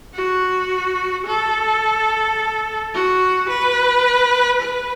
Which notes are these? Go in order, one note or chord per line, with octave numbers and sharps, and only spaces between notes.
F#4
A4
F#4
B4
B4